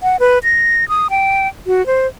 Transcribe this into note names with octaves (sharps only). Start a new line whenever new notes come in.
F#5
B4
A#6
D#6
G5
F#4
C5